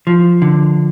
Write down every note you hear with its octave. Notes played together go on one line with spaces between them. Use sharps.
F3
D3